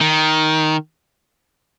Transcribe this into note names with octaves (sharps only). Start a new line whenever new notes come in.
D#3